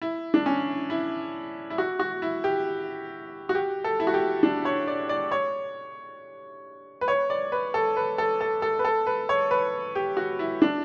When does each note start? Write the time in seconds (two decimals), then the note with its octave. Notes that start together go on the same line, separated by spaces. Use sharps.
0.02 E4
0.34 D4
0.46 C#4
0.90 E4
1.70 E4
1.78 F#4
1.99 F#4
2.22 E4
2.44 G4
3.49 F#4
3.55 G4
3.84 A4
4.00 E4
4.07 F#4
4.14 G4
4.43 D4
4.65 C#5
4.88 D5
5.09 D5
5.32 C#5
7.01 B4
7.08 C#5
7.30 D5
7.52 B4
7.74 A4
7.97 B4
8.18 A4
8.41 A4
8.62 A4
8.79 B4
8.85 A4
9.07 B4
9.29 C#5
9.51 B4
9.95 G4
10.17 F#4
10.39 E4
10.62 D4